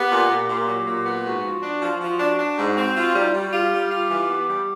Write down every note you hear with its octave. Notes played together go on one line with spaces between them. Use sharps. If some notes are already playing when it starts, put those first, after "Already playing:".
Already playing: B3 G4
A#2
A#2
A#2
F#3
A#2
B3
G#2 F#4
F3
D4
F3
F3
D4
D4
G#2
C4
F4
G3 D#4
E4
G3 F4
F#4
F4 G4
G3
F4
E3
B3
G3